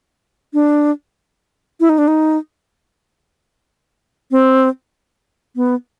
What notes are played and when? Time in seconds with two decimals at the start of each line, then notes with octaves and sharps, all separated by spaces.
0.54 D4
1.80 E4
1.89 D#4
1.98 D4
2.08 D#4
4.31 C4
5.56 B3